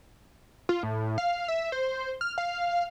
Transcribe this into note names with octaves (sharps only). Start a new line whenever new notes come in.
F4
A2
F5
E5
C5
F6
F5